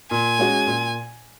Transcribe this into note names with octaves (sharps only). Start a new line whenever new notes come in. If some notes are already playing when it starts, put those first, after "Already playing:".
A#2 G#5
G#3 C#4 F#4
A#2